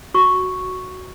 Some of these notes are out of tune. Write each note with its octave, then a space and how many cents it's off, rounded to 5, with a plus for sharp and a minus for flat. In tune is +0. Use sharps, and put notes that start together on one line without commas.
F#4 +0 C#6 +0